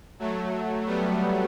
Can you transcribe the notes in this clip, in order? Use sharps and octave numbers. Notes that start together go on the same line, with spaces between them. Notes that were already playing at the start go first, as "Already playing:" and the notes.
F#3 A3
G3 B3